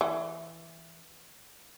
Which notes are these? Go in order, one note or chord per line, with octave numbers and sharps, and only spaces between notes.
E3